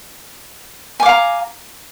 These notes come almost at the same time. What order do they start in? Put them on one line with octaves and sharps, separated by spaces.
G#5 D6 F5 A#5